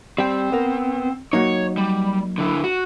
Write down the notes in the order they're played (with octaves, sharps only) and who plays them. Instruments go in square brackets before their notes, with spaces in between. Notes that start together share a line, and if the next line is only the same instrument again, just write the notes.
[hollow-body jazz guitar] G3 G5 [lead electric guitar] C4
[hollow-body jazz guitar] B3 A#4
[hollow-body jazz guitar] F#3 A#3 D#4 [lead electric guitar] C#5
[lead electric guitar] G3
D3 E4
F#4